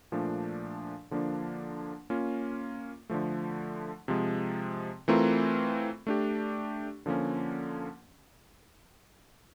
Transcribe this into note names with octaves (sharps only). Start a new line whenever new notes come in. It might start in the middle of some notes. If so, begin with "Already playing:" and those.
A#2 F3 A3 D4
D3 F3 A#3 D4
A#3 C#4 F4
D3 F3 A3
C3 F3 G#3
E3 A3 C4 F4 A#4
A3 D4 G4
D3 F3 A#3 C#4